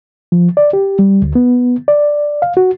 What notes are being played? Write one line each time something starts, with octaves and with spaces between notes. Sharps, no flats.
F3
D5
G4
G3
D2
B3
D5
F5
F#4